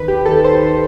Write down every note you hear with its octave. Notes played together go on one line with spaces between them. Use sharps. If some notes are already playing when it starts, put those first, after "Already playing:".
Already playing: D#2 D#3 B4
G4
D#2 D#3 A4
C5
D#2 D#3 C5